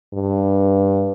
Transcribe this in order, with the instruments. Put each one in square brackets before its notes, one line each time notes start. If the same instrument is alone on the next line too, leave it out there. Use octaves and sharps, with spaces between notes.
[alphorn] G2